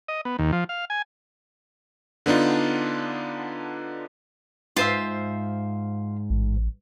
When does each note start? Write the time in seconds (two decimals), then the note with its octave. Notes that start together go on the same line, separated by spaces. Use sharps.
0.08 D#5
0.25 B3
0.39 D#2
0.52 F3
0.69 F5
0.90 G#5
2.26 D3 B3 D4 D#4 F4
4.76 G#2 F4 C5 E5
6.30 A1